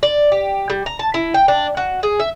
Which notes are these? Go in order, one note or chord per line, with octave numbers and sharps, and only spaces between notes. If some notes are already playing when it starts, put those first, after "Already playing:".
D5
G4
G3
A#5
A5
E4
G5
D4
F#4
G#4
E5